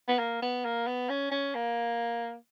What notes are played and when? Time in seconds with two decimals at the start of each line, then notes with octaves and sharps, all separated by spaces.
0.08 B3
0.19 A#3
0.42 B3
0.65 A#3
0.87 B3
1.09 C#4
1.31 C#4
1.54 A#3